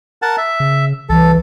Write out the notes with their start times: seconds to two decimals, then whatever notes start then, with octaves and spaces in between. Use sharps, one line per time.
0.22 A#4 F#5 A5
0.38 E5
0.60 C#3
1.09 C2 E3 A4